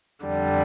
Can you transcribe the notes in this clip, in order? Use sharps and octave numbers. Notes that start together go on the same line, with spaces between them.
F2 D3 G3